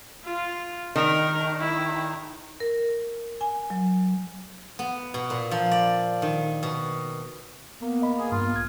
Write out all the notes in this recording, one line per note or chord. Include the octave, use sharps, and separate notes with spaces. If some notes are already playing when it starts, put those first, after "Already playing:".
F4
D#3 A#4
E4
A#4
G#5
F#3
B3
B2
A#2
F3
D5
D#3
B2
A#3 B3
D#5 B5
G#4
G2 F4
A#1 G#6